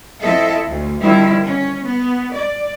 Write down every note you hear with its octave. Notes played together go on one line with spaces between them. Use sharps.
F3 C4 E4 A4 D#5 E5
D2
D3 D#3 F3 G3 C4 E4
C#4
B3
D5